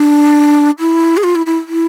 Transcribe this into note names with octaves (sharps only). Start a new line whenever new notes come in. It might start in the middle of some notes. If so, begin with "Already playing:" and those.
Already playing: D4
E4
G#4
F4
E4
E4
E4